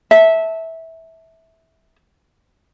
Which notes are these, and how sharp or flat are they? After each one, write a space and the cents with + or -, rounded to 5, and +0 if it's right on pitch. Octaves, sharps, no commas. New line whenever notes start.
E5 -15 A5 +0